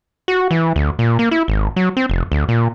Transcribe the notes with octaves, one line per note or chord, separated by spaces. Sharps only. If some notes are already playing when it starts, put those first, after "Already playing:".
F#4
E3
D2
A#2
A#3
E4
G#1
F#3
C4
F1
D2
A#2